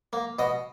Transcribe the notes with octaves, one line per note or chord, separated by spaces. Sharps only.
A#3
B2 D#5